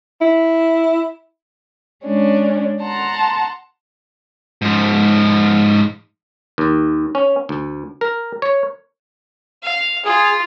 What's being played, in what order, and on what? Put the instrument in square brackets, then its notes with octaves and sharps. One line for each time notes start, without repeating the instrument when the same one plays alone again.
[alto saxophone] E4
[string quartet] G#3 C#4 D4
F#5 A5 A#5 C6
[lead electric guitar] G#2 F3
[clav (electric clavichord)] D#2
C#4
D2
A#4
C#5
[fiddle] F5
[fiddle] F4 [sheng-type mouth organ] G#4